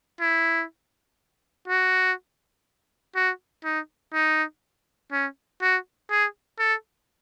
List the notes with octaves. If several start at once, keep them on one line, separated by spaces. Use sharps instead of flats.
E4
F#4
F#4
D#4
D#4
C#4
F#4
G#4
A4